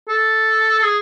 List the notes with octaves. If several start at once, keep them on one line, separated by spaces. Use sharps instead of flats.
A4
G#4